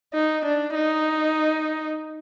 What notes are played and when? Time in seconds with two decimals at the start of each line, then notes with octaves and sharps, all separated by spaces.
0.14 D#4
0.45 D4
0.75 D#4